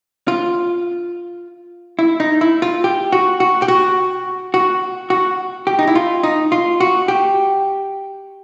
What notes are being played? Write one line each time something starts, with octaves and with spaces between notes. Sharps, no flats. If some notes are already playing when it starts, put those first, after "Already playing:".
F4
E4
D#4
E4
F4
G4
F#4
F#4
G4
F#4
F#4
F#4
G4
D#4
E4
F4
D#4
F4
F#4
G4